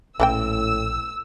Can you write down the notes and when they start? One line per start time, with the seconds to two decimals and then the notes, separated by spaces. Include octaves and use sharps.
0.20 A#1 A2 E3 C#4 A4 G5 E6